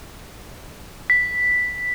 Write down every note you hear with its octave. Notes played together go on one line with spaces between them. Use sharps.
B6